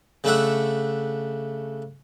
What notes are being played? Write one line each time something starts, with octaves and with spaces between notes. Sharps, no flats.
C#3 A3 D4 E5 F#5